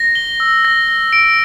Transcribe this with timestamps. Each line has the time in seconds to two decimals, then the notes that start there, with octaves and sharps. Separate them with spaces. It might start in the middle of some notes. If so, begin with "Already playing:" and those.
Already playing: A#6
0.15 G7
0.40 E6
0.65 A#6
0.89 A#6
1.13 D7